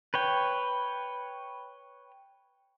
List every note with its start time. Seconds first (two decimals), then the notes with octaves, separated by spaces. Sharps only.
0.14 B4 C#5 G5